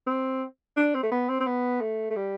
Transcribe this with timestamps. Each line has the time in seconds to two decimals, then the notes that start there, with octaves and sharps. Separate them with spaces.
0.07 C4
0.76 D4
0.95 C4
1.03 A3
1.11 B3
1.29 C4
1.40 C4
1.46 B3
1.81 A3
2.11 A3
2.16 G3